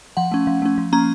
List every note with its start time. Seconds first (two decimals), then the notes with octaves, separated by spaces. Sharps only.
0.17 F3 F#5
0.32 A3 C#4
0.47 F3
0.62 A3 C#4
0.78 F3
0.92 A#3 C#4 A#5